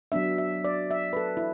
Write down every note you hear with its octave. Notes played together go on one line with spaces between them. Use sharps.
F#3 B3 D4 E5
E5
D5
E5
B4
A4
E4